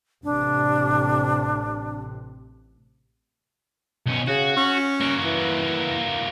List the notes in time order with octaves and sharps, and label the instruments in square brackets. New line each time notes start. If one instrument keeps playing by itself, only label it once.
[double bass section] A1 C3 [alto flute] D4
[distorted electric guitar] B1 C#4
[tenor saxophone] C#3 [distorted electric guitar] F#4
[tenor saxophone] C#4
[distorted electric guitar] A#3 F#4
[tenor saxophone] E3